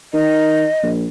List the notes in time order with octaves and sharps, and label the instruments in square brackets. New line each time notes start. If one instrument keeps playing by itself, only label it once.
[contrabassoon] D#3 [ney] D#5
[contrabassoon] A#1